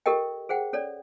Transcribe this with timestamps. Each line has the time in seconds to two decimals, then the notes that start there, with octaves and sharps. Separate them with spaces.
0.06 G4 A4 A#4 D#5 G5
0.49 G#4 C5 F#5 G5
0.73 C#4 A4 C#5 D5